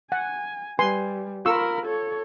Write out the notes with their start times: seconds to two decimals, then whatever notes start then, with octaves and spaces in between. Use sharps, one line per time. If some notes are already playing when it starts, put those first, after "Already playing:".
0.12 F#5 G#5
0.79 G3 B4 G#5 C6
1.46 F4 A#4 B5 C#6 E6
1.86 A4 C#5